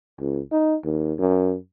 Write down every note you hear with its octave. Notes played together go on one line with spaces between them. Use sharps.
C#2
D#4
D#2
F#2